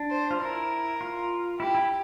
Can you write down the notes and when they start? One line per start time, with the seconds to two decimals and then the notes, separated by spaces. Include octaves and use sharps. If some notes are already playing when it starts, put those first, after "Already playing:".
Already playing: D4
0.10 C5
0.31 F4
0.40 E4 A#4
1.01 F4
1.60 E4 G4
1.75 E4